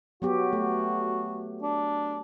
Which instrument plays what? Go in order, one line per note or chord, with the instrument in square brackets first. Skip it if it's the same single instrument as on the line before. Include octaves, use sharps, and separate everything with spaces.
[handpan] F#3 B3 G4 [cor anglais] F#4
[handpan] A3
[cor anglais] D4